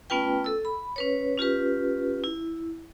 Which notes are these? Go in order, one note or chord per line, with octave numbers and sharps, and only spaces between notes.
A3 B3 C#4 F4 B4 G5
A4 E6
B5
C#4 B4 C#5
C#4 F4 G4 B4
E4